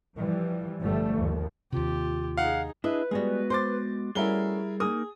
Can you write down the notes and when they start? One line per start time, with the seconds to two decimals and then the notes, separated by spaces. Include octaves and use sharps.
0.17 E3 F3 G3
0.82 G1 G2 F3 G3 A3
1.15 D#2 F3
1.72 D#2 C3 F4 G4
2.37 D#4 G#4 F5 F#5
2.84 D4 E4 G#4 B4 D#5
3.11 G3 G#3 B3 F#4 G#4
3.50 C5 C6 D6 A6
4.15 G3 A3 C#4 E4 F#4 G#4 A#4 G7
4.80 A#3 D#4 G#4 A#4 D#6